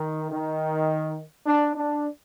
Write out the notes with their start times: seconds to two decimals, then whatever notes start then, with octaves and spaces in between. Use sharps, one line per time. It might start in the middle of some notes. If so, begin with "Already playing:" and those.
Already playing: D#3
0.32 D#3
1.46 D4
1.76 D4